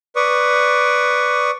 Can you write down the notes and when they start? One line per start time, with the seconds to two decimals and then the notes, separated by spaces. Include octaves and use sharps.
0.16 B4 D5 C#6 D#6